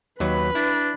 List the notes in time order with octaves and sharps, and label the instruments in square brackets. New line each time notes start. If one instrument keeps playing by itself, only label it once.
[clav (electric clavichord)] D#2 F#3 [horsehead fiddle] B4 B5
[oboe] D4 [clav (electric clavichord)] E4